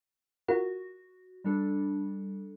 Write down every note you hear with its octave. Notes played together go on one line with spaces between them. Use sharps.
F4 F#4 A#4 F#5
G3 D4 A4